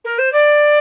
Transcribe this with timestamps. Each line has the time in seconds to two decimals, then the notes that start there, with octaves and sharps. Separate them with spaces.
0.04 A#4
0.18 C5
0.32 D5